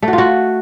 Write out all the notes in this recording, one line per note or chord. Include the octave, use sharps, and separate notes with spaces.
A3
F#4
F4
F#4